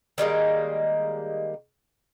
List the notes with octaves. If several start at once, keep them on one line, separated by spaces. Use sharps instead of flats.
D#3 G3 G#3 A#3